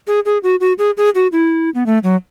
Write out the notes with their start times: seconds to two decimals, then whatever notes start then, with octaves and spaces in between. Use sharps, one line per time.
0.07 G#4
0.25 G#4
0.43 F#4
0.60 F#4
0.78 G#4
0.97 G#4
1.15 F#4
1.32 E4
1.75 B3
1.86 A3
2.03 F#3